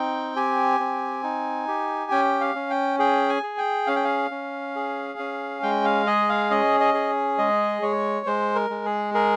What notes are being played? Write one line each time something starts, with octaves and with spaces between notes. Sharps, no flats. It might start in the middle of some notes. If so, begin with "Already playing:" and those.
Already playing: C4 D#4 G5
G4 G#5
C4
D#4
G4
C#4 G5
F5
C#4
G5
G#4 G5
G#5
G#4
G5
C#4 F5
G5
F5
C#4
G#4
C#4
G#3 G5
F5
G#4 D#5
F5
C#4 D#5
D#5
G#4
G#3 D#5
G#3 C#5
G#3 C5
A#4
G#3
G#4
G#4 A#4